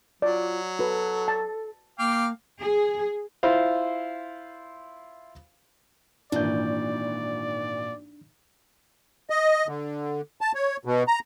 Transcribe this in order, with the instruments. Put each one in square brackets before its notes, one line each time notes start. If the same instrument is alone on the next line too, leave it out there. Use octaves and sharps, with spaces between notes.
[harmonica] F#3 [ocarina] F4 [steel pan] D5
[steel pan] F#4 B4 [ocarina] A4
[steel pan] A5
[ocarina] A#3 [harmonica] F5 G5 D6
[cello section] G#4
[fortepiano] E4 F4 C5 F5
[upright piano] G#1 D#3 E3 [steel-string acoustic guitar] A#2 [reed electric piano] D4 G6 [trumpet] D5
[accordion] D#5
D3
A5
C#5
B2
A#5